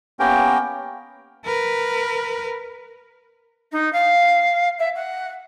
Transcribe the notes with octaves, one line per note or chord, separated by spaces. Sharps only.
A#3 B3 C#4 G4 A#4 G5
A#4 B4
D#4
F5
E5
F#5